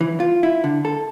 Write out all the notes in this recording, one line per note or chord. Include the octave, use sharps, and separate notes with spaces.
E3
F4
E4
D3
A4